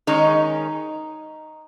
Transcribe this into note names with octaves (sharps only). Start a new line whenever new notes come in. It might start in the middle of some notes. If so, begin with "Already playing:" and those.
D#3 G#3 C#4 D#4